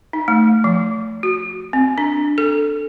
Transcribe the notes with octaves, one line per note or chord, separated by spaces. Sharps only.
D#4
A3
F3
F#4
C4
D4
A4